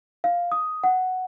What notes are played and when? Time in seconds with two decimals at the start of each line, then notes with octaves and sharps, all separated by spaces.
0.24 F5
0.52 D#6
0.84 F#5